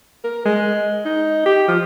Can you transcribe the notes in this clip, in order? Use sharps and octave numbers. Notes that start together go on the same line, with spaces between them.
A#4
G#3
D#4
G4
F3